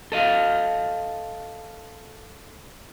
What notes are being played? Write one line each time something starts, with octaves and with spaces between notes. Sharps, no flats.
A4 D#5 F5